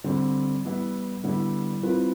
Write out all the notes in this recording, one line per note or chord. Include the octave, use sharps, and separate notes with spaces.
D3 G3 C4
E3 G3 B3 E4
D3 G3 B3 E4
E3 G3 C4 F4 B4